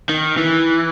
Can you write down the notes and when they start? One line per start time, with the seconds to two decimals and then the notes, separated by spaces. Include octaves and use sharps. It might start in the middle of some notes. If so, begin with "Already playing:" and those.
0.09 D#3
0.37 E3